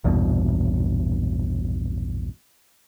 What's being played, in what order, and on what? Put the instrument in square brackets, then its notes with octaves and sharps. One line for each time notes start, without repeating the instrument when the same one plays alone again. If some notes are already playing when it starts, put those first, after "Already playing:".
[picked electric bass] A#1 E2 G2 B2